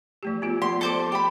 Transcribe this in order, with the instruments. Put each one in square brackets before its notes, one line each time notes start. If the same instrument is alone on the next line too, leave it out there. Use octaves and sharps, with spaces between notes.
[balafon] F3 A3 G4
B3 F4 G4
[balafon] F3 A#3 [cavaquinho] C6
[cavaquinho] A4 C5 D5
G4 B5